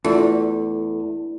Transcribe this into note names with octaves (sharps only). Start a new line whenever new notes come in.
E2 A3 D4 E4 F4 A4 E5